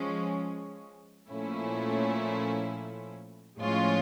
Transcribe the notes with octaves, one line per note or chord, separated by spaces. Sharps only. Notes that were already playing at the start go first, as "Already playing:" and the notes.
Already playing: F3 G#3 C#4
A#2 F3 A3 C#4 E4
A2 F3 G#3 C#4 F4